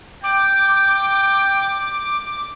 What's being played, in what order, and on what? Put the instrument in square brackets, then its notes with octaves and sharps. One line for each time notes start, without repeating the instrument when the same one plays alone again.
[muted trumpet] G5 [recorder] D6